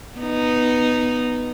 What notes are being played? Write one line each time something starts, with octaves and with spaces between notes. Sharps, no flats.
B3 D#4